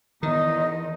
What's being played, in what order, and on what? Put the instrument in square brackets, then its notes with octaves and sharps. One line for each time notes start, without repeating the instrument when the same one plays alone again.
[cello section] E2 [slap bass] D#3 [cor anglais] D#4 [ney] D#5